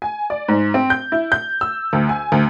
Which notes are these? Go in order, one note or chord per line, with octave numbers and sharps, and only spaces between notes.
G#5
D5
G#2
C4
G6
E4
G6
E6
D2
G#5
D2